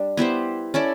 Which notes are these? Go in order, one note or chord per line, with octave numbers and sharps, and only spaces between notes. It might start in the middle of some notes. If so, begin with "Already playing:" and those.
Already playing: G3 D4
B3 E4 G4 C5
C#4 E4 A4 D5